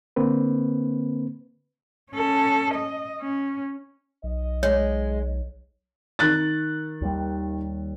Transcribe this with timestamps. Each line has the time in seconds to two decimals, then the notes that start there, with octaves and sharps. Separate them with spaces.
0.16 D3 A#3 C4 B4
2.12 C#4 A4
2.74 D#5
3.21 C#4
4.24 B1 D#5
4.63 G#3 C#5
6.19 D#3 F#6 A6
7.01 D#2 G3